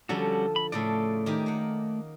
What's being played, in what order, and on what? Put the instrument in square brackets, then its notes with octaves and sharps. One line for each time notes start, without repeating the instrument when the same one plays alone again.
[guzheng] D3 F3 A4 [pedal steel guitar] G3 C#4 F#4
[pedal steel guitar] B5
[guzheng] A2 C#3 A4 [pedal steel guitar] A3 D5
[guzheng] D#3 G4 G#5
A#3 F#5